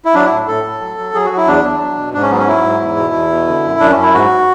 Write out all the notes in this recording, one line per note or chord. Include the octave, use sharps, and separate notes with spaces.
E4
F#3 D4
A2 E4
A2 A4
A2
F#3
F#3
F#3 G#4
F#3 F#4
E4
E2 D4
E2
F#3
B2
G#2 D4
C#4
F#3 B3
C#4
F#3 E4
G#2
E2
B2
E2
B2
D3
F#2
F#2 D4
F#2 C#4
E4
G#2 F#4